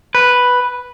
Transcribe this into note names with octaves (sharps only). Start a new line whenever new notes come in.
B4